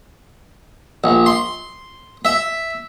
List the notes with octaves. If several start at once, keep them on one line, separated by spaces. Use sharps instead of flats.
A#1
C6
E5